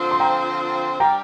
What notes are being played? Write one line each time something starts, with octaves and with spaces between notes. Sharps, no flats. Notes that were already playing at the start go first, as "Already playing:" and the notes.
Already playing: D3 F3 C4 F4 C5
C6
G5 A#5
G3 D4 G4 D5 F5 G5 A#5